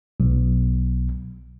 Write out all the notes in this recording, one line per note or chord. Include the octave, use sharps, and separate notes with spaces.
B1